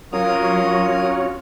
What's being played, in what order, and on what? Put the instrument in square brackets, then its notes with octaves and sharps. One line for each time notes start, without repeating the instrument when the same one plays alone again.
[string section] F#3 [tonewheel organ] C#4 F#4 C#5 [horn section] F4 [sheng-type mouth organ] A#4 D#6